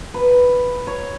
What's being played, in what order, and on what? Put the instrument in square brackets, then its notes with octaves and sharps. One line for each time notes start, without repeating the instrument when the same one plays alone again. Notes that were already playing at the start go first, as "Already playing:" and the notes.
[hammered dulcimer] B4
C#5